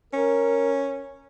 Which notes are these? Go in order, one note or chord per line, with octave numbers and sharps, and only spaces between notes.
C#4 A#4